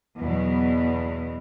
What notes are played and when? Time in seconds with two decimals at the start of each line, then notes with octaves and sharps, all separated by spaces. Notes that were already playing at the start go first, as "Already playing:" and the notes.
0.18 E2 B2 F#3